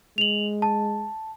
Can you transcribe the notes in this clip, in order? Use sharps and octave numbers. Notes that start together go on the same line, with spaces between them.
G#3 F7 F#7
A5